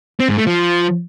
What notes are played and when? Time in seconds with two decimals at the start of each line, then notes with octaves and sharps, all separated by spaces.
0.20 C4
0.29 G#2
0.38 A3
0.47 F3